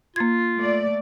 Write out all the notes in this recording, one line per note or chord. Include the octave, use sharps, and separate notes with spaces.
A#3 F4 G#6
A3 D5